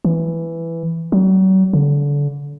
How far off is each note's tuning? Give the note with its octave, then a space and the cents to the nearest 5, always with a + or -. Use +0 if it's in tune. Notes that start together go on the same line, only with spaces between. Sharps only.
E3 +5
F#3 +40
D3 -30